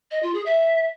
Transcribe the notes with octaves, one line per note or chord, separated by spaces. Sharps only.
D#5
F4
G#4
E5